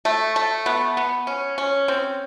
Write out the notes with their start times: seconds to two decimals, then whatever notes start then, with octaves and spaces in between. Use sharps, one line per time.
0.05 A3
0.36 A3
0.66 B3
0.97 B3
1.27 C#4
1.58 C#4
1.88 C4